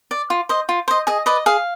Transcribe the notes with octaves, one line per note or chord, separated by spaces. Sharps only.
D5
F4
C5 D#5
F4
C5 D#5
G#4 D#5
B4 D5 D#5
G#4 F5